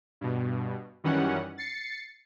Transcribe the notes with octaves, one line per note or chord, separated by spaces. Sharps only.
G2 B2
F#2 D#3 E3 G3 C#4 F#5
A6 C7 C#7